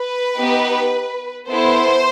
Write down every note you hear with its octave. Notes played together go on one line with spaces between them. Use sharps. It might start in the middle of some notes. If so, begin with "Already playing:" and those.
Already playing: B4
B3 D#4 G4
B3 E4 A4 C5